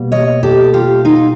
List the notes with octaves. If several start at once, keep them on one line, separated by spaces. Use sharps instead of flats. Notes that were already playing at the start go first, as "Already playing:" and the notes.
Already playing: B2 G3 A#3
C#5 D#5
G4 A4
F4 G4
D#4 F4